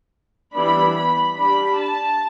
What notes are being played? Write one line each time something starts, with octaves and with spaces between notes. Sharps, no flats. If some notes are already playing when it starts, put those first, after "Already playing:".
E3 G3 B3 D4 B5
B5
G3 D4 B5
A5